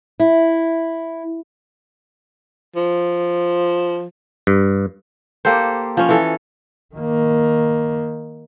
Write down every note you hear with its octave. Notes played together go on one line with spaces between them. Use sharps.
E4
F3
G2
A#3 G4 A4 C5
F3 C#4
E3 A4
D#3 A#3